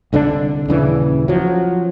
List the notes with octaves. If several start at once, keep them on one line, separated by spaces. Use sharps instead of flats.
C2 D3 D#3 D4
D#1 C#3 E3
F3 F#3